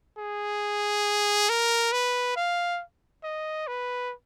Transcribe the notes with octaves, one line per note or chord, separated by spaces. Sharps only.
G#4
A#4
B4
F5
D#5
B4